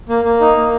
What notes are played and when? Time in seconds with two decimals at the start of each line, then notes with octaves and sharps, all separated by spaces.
0.09 A#3
0.24 A#3
0.40 D#4
0.56 A#3